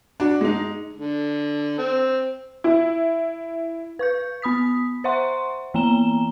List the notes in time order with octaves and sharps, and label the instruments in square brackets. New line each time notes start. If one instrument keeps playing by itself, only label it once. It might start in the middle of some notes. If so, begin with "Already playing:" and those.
[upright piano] D4 F#4
G#3 D#4
[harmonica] D3
C4
[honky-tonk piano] E4
[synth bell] B4 C#6 G6
B3 B5 D#6 B6
C5 E5 F#5 C6 C#6
E3 A#3 B3 A#5 E7 G7